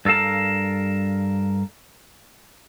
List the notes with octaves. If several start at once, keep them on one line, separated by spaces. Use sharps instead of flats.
G2 A4 A#4 F5 A5